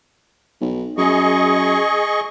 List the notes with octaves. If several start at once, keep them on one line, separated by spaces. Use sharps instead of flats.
B1
F#2 G#4 D#5 C#6